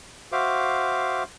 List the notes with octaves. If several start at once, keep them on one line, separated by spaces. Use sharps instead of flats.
F#4 C5 E5 F5 D6